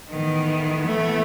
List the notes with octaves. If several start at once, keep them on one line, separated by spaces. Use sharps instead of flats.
A2 D#3 E3 B3
A3